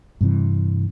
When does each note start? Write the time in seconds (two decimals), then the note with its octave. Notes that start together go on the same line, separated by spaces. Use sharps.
0.21 G2 C3 E3